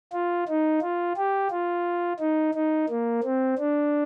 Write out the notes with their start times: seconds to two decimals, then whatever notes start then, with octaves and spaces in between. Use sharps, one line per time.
0.13 F4
0.49 D#4
0.82 F4
1.17 G4
1.51 F4
2.20 D#4
2.55 D#4
2.90 A#3
3.24 C4
3.58 D4